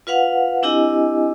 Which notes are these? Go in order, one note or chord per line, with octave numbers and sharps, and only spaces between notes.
F4 B4 F5 F#5
C4 D4 E4 G4 D#5 G#5